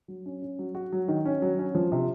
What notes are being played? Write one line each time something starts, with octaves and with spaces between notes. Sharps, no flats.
F#3
C#4
C#4
F#3
F#4
F#3
D#3
C#4
F#3
C#4
F3
C3